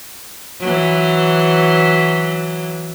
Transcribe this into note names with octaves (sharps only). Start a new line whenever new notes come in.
E3 F#3